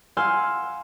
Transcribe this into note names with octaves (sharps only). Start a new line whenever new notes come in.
F5 F#5 G#5 C6 E6 G6